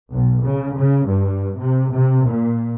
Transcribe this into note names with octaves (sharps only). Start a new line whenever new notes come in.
B1
C#3
C#3
G2
C3
C3
A#2